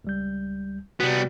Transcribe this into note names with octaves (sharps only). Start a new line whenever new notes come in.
C#2 G3 G6
C3 G3 B3 F#4